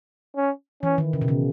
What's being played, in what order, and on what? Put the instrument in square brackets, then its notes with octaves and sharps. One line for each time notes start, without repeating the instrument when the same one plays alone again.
[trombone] C#4
[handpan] E3 [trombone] C#4
[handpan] D#3
C#3
B2
C#3